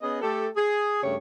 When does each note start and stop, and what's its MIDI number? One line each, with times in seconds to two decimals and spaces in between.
0.02 0.20 59
0.02 0.20 61
0.02 0.20 68
0.02 0.20 75
0.21 0.47 57
0.21 0.47 67
0.21 0.47 69
0.56 1.01 68
1.03 1.15 43
1.03 1.15 49
1.03 1.15 57
1.03 1.15 67
1.03 1.15 73